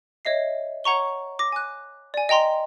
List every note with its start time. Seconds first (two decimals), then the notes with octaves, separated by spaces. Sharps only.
0.25 C#5 D#5 E5 C7
0.84 C#5 F#5 A#5 C#6 G7
1.39 D6 A#6
1.52 G#5 F#6
2.14 D5 G#5
2.29 D#5 G5 A#5 C6